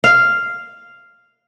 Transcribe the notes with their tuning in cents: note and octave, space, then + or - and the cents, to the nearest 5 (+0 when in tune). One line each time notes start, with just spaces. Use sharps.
F5 -5